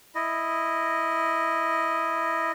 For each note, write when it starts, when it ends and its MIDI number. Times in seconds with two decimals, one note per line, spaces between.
0.15 2.52 64
0.15 2.52 75